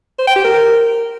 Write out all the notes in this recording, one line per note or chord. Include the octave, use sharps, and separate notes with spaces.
C5
G5
G4
A#4